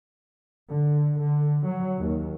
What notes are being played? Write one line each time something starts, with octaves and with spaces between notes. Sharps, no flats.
D3
D3
F#3
D#2